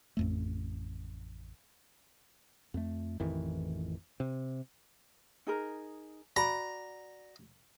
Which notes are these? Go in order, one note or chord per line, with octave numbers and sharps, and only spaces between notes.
A1 F2 A3
F2 A3
A1 F2 D#3 E3
C3
D#4 G#4 A#4
F#4 D5 A#5 B5